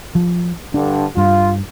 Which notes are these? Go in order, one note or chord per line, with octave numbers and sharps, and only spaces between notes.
F3
G2 D3 D4
G2 F4